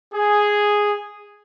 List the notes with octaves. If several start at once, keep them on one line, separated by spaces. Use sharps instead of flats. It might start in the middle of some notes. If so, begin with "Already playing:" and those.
G#4